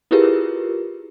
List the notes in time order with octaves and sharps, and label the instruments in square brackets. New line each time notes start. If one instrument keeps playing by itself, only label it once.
[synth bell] E4 F4 G4 G#4 A#4 B4